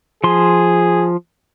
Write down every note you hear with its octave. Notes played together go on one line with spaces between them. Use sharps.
F3 G#4 C6